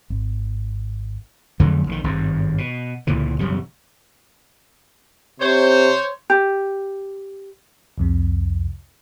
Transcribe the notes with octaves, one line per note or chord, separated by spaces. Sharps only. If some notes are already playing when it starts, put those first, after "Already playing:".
G#1
F2 D3 F#3 A3
A#1 D3 D#3
G#1 G2
B2
C#2 A#2 D3 E3
E1 F#2 C#3 G3
C3 C5 C#5
G4
C2 F2 C3